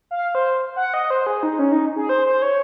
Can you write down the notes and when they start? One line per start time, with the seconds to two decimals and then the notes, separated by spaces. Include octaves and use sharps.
0.11 F5
0.35 C5
0.76 F#5
0.94 D#5
1.10 C5
1.27 G#4
1.43 D#4
1.59 C#4
1.72 D#4
1.96 G#4
2.09 C5
2.26 C5
2.42 C#5